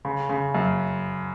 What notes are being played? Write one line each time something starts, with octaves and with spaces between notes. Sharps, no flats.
C#3
C#3
F#2